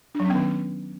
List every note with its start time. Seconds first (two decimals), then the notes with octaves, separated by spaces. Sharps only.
0.15 D4
0.20 F#3
0.25 C#4
0.30 B3
0.35 D#3